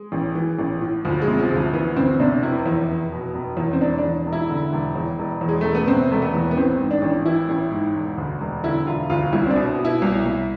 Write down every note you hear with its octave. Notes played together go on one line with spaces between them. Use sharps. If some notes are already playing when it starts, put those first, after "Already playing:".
Already playing: G#3
A1
E3
A1
A2
D2 F3
G#3
C3
G#3
F3
D2
F3
E3 B3
D2 C4
C3 D4
F1 E4
E2
F1
B2
F1
E2
C4
E1 D4
D4
E2
E1
E4
D3
E1
E2
E1
E2
G#3
E1 A3
B3
C3 C4
E1 A3
B3
E2
B3
A1 C4
G#2
D4
A1
E3 E4
A1
G#2
E1
D2
E1
D3 E4
E1 F4
D2 F4
C2 E4
C4
D4
B2
B2
E4
C2
C2